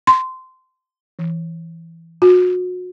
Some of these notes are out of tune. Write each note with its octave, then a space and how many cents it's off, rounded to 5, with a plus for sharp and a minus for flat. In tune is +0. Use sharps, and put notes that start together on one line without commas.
C6 -20
E3 +5
F#4 -35